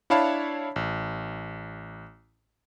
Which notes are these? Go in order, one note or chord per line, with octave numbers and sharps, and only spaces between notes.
D4 E4 C#5 F5 A5 B5
A1